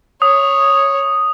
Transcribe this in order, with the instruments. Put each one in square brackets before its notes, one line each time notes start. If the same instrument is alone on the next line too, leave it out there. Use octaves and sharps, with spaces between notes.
[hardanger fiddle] C#5 [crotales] D#6